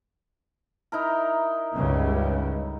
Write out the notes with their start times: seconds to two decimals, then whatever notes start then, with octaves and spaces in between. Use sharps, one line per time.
0.92 D#4 E4 A#4
1.73 C#2 G2 C#3